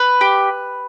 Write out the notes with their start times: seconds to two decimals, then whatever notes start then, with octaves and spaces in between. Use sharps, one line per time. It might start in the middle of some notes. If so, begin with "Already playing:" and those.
Already playing: B4
0.21 G4